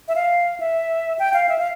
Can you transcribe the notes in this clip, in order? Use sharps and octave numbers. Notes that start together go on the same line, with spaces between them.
E5
F5
E5
G5
F5
E5
F5